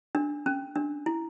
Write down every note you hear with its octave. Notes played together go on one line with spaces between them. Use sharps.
D4
C#4
D4
E4